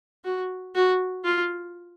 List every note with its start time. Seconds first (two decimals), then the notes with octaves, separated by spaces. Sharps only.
0.24 F#4
0.75 F#4
1.24 F4